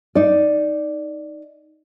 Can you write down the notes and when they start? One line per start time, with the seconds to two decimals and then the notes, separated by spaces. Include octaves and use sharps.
0.15 D#4 D5